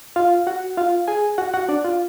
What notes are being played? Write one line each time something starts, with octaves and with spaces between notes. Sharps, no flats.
F4 F5
F#4 F#5
F4 F5
G#4 G#5
F#4 F#5
F#4 F#5
D4 D5
F4